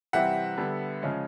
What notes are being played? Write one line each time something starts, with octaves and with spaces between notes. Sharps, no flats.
C3 E3 G3 C4 E5 F#5
D3 G3 B3
C#3 F3 G#3 C#4